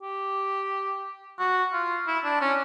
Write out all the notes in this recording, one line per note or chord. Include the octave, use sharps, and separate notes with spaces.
G4
F#4
F4
E4
D4
C#4